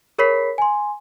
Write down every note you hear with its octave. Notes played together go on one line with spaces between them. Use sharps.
G#4 A#4 C#5 B5 B6 C7
G#5 C6